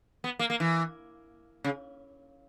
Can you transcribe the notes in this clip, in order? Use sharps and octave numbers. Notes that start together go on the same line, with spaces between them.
B3
A#3
A#3
E3
C#3